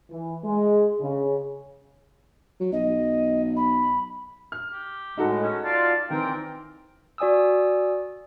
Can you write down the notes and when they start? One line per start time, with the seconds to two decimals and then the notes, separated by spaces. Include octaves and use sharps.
0.10 E3
0.44 G#3
1.00 C#3
2.60 F#3
2.73 B1 D#5
3.57 B5
4.52 F6
4.71 G4
5.17 A2 G#3 D#4 F#4 A4
5.43 C#4
5.64 F4 D5 F5 A5
6.10 D#3 E3 C4 A#4 G5
7.18 F#4 D5 G#5 D#6 E6